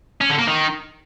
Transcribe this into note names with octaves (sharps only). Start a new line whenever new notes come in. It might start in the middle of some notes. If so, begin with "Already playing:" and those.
C#4
D3
A#3
D#3